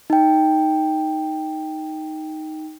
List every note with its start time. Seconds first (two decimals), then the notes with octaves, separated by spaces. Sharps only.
0.10 D#4 G5